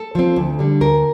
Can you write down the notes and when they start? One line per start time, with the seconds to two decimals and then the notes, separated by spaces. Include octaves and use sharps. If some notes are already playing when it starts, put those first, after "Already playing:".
Already playing: A4
0.15 F3 C4
0.36 D2
0.59 D3 G3
0.81 D2 A#4